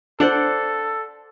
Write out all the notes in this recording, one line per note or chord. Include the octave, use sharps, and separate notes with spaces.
D4 A4 C5 D5 F#5